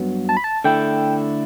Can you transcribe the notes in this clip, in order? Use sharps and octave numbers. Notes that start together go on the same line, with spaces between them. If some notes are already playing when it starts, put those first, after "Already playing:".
Already playing: G2 F#3 B3
A5
B5
A5
D3 A3 E4 G5